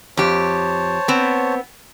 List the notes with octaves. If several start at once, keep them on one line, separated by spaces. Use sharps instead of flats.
F2 G4 C5 C#5 A5
B3 C4